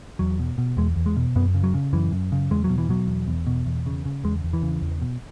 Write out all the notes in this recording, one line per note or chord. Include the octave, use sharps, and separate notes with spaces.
E2 F#3
B2
B2
E2 G#3
E2
G#3
B2
F#2 B3
C#3
F#3
C#3
F#2 E3
F#2
C#3
E2 G#3
F#3
B2
E3
B2 F#3
E2
E2
B2
E2
C#3
C#3
E2 G#3
E2
E3
C#3
E2
B2